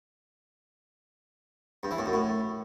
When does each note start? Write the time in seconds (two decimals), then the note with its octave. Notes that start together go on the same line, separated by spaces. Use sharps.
1.83 G2
1.91 E3
1.98 A2
2.06 F#2
2.13 A2